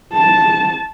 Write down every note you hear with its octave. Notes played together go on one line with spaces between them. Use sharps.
A5